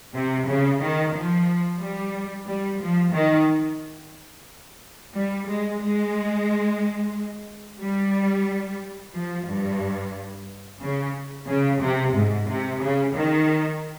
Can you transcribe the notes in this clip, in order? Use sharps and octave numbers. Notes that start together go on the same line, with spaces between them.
C3
C#3
D#3
F3
G3
G3
F3
D#3
G3
G#3
G#3
G3
F3
G2
C#3
C#3
C3
G#2
C3
C#3
D#3